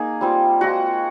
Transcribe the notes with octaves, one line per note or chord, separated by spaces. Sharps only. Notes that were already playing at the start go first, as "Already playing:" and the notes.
Already playing: A#3 D#4 G#4 A#4
G3 C4 F4
G#3 C4 F4 F#4